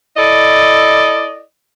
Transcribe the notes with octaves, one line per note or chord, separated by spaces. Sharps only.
E4 A4 D5 D#5